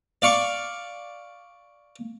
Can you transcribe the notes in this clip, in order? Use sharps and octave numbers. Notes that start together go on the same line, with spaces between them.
D5 F5 C#6